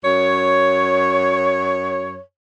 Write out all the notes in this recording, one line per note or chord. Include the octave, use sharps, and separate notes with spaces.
F#2 C#5